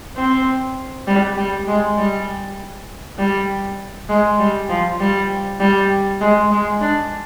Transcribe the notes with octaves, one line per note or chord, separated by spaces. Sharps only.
C4
G3
G3
G#3
G3
G3
G#3
G3
F3
G3
G3
G#3
G#3
D4